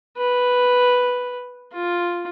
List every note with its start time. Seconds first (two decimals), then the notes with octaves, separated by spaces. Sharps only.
0.18 B4
1.73 F4